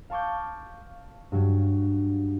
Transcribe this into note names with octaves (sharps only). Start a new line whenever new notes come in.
F5 A5 C#6 D6 G6
G2 F#3